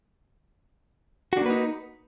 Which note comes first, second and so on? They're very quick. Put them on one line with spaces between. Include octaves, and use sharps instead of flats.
F#4 D4 A#3 B4 D#4